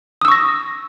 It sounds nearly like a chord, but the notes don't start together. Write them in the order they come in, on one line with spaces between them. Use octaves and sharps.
D#6 E6 C#6 A#6